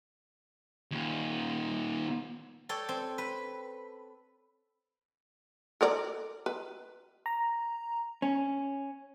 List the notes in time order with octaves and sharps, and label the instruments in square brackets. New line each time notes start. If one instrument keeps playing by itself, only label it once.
[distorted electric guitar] D#2 A#2
[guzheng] A4 C#5 D5 G5
C4
B4
[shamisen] A4 A#4 D5
B4
[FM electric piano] A#5
[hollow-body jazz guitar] C#4